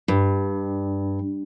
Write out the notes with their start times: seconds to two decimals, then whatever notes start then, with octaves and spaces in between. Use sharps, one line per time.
0.08 G2